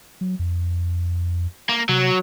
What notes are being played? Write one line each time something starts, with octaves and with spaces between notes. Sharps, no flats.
F#3
F2
A#3
C3 F#3